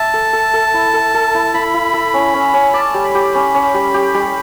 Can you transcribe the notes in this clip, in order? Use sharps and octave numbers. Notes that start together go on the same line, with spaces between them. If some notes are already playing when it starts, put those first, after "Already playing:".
Already playing: E5 A5
A4
A4
A4
E4
A4
A4
E4
E4 B5
E4
A4
C#4
C#4
C#4
D5 A5
G3
B5
G4
C#4
C#4
G3
G4
G3